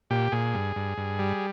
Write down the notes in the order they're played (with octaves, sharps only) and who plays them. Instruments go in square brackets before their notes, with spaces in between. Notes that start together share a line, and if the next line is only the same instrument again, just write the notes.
[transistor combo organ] A#2 G4
A#2 G#4
G2
G2
G2
G3